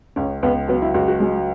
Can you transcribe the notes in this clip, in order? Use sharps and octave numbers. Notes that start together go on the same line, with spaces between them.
C#2 C#4
C#2 B3
F#3 B3
E4
C#2 F#4
F#4
F#3 G#3